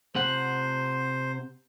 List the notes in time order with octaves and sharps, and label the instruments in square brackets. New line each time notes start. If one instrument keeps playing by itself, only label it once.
[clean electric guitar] C3 F#5 [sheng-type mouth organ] C5